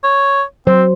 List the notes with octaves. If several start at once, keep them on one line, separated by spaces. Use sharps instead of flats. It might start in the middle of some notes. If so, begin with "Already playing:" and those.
C#5
F#3 C4 C5